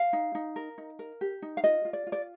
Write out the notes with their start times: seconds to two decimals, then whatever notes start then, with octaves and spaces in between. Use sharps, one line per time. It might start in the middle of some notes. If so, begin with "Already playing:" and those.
Already playing: F5
0.13 D#4
0.35 D#4
0.56 A#4
0.78 D#4
0.99 A#4
1.21 G4
1.42 D#4
1.57 F5
1.64 F4 D#5
1.85 F4
1.93 D5
2.07 F4
2.12 D5